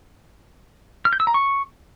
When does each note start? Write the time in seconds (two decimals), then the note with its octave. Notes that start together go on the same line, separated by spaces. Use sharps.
1.05 F6
1.13 G6
1.20 E6
1.27 A#5
1.34 C#6